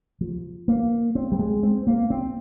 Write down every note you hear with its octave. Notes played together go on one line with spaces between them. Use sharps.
F3
A#3
C4
G3
G#3
C4
A#3
C4